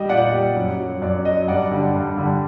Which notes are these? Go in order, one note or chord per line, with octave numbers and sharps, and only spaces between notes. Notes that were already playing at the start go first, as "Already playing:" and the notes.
Already playing: G3 D#5
A#2 D5 F#5
G3
F#2
F#3
F#2 D5
F#3 D#5
G2 D5 F#5
D3 G3
G2
D3 G3